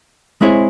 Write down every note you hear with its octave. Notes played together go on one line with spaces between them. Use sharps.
G#3 C4 E4 G#4 C#5